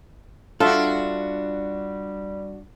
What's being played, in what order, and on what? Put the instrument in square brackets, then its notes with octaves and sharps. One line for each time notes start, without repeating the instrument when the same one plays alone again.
[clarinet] G3 [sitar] D4 F#4 [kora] F4 E5 [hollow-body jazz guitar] A4